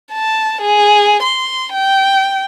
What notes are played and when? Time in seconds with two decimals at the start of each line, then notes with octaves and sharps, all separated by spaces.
0.13 A5
0.62 G#4
1.23 C6
1.73 G5